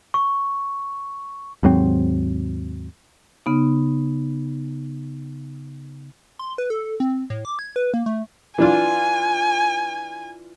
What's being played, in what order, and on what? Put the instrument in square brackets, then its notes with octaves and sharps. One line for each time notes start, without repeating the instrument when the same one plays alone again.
[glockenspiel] C#6
[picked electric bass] D#2 G#2 F#3 C4
[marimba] C#3 B3 D#4
[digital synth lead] C6
B4
A4
C4
A2
D6
G#6
B4
A#3
A3
[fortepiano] E3 D4 F4 [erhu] G#5